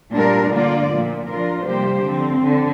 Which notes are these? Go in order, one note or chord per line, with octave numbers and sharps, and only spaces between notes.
A#2 G3 D4 A#4
D3 A#3 F4 D5
A#2 F3 A#3
F3 D4 F4 A#4
C3 G3 A#3 G4 C5
D3 F3 C4
D3